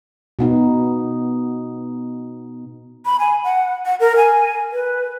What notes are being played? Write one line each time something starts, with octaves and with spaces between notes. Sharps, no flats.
B2 B3 D#4
B5
G#5
F#5
F#5
A#4
G#5
B4